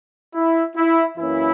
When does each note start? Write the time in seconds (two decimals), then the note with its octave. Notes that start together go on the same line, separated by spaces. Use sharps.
0.34 E4
0.76 E4
1.17 F#2 E3 A#3 C#4 E4